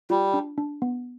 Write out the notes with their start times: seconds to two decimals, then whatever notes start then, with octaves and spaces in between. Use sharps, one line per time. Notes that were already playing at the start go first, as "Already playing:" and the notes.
0.10 G3 F4
0.34 D4
0.58 D4
0.82 B3